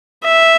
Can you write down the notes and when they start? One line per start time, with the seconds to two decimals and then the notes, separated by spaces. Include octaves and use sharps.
0.24 E5